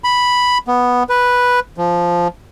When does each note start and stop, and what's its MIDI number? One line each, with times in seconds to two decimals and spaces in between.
0.04 0.58 83
0.68 1.03 59
1.09 1.60 71
1.78 2.28 53